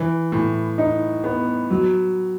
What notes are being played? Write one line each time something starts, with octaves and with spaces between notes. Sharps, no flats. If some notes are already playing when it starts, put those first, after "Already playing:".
Already playing: E3
A2
D#4
B3
F#3